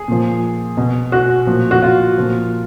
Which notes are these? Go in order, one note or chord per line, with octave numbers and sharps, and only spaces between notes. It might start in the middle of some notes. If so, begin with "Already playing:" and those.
Already playing: G#4
A#2 F3
B2
F#4
A#2 F3
F#4
F4
A#2 F3